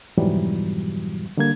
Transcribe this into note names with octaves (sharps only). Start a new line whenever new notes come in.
F2 G#2 B2 E3 F#3 G3
D3 G3 A#3 G#6